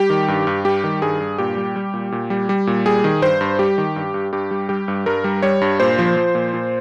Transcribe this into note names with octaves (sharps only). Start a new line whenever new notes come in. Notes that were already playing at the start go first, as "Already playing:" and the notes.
Already playing: G3 G4
D#3
G2
G2
G3 G4
D#3
G2 G#4
G2
A#2 G4
G3
G3
A#2
A#2
G3
G3
A#2
G3 G#4
D#3
G2 C5
G2
G3 G4
D#3
G2
G2
G2 G4
G3
G3 G4
G2
G2 A#4
G3
G3 C#5
G2
A#2 C5
F3
F3
A#2
A#2